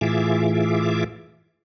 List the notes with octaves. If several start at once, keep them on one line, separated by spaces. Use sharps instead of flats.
A2 E3 F4 G#4 E5 D6